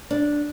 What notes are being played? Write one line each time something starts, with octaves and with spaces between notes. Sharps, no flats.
D4